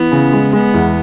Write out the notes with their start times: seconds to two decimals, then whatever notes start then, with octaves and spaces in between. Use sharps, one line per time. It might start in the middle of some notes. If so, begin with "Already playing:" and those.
Already playing: E3 B3
0.12 C#3
0.33 G#3
0.53 G#3 B3
0.74 E2